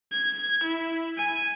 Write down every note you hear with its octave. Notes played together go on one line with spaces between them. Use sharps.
G#6
E4
G#5